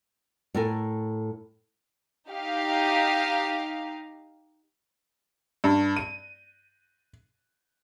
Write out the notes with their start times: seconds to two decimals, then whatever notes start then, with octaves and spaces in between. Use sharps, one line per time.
0.54 A2 A4 A#4 G#5
2.28 D#4 G4 F5
5.64 G2
5.96 D#7